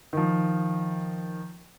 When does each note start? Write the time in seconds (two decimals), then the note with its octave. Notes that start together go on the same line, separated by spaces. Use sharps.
0.13 D#3 F3